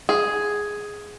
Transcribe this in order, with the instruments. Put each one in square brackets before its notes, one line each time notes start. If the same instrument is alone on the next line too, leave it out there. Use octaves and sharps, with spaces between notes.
[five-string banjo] G#4